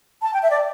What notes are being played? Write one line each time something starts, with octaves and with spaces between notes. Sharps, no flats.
A5
G5
E5
D5